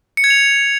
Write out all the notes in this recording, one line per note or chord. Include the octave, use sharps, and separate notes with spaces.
C#7
G#6
F7